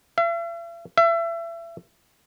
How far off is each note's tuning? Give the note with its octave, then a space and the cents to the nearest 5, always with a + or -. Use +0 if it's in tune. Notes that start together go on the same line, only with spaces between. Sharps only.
E5 +45
E5 +30